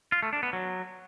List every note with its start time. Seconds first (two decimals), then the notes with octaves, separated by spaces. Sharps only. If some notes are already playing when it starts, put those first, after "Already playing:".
0.12 F4
0.23 A3
0.33 D4
0.43 B3
0.53 F#3